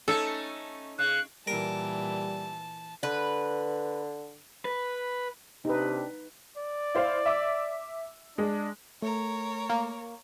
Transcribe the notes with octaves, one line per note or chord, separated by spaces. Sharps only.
A3 C#4 D#4 A4
C#3 F#6
A#2 E3 G3 A#4 A5
D3 B4
B4
C3 D4 D#4 G4 B4
D5
E4 C5 F5
E5 D6 E6
G#3 D4
A3 A#4 C#5
A#3